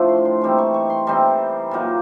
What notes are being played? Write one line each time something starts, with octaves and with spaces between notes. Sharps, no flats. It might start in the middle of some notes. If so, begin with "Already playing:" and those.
Already playing: A2 F3 A3 D4
C6
C6
E3 G3 C4 D#4
C#6
C#6
C6
E3 G3 C4 D#4 C6
A#2 F#3 A#3 D#4